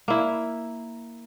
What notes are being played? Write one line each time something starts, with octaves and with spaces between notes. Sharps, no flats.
A#3 E4